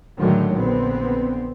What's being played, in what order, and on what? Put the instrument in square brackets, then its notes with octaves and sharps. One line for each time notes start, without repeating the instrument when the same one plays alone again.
[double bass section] A2 D3 D#3 F#3 G#3 A3
A#1 D3 B3 C4